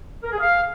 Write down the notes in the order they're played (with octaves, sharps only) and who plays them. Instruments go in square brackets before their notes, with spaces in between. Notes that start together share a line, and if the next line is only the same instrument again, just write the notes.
[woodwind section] A#4
G#4
F5